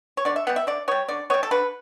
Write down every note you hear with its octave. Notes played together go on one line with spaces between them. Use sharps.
C#5
D3 D5
E5
G3 B3 F#5
E5
D3 D5
G3 B3 C#5
D3 D5
G3 B3 C#5
A4
D3 B4